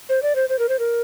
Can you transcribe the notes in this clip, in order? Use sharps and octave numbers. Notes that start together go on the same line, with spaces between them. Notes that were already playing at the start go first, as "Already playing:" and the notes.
C5
D5
C5
C5
A#4
C5
A#4